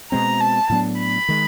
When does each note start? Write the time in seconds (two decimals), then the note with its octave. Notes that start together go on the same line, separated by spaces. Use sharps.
0.12 B2 G#3 C4 A#5
0.40 A5
0.70 A2 F#3 B3 D4
0.99 B5
1.29 D#3 G#3